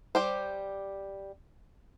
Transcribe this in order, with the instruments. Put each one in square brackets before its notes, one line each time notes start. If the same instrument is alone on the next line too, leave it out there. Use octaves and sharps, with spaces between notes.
[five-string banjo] G3 G4 C5